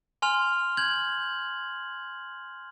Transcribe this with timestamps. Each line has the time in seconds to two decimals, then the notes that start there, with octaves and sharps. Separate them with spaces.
0.22 G#5 C6 F6 F7
0.77 G6 G#6 F#7